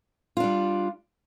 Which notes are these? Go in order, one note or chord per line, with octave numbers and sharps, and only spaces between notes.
G3 D4 F4